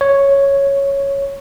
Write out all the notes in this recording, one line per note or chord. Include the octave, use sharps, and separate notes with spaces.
C#5